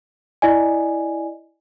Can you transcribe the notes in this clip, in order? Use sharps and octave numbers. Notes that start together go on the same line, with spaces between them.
E4 D5 D#5 G#5